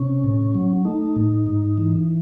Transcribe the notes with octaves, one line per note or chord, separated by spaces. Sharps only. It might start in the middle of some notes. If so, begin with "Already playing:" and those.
Already playing: C3 C#4
A2
F#3
A3 D#4
A2
G#2
E3